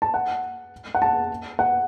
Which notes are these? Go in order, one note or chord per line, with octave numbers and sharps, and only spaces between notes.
A5
F#5
F#5
A5
F#5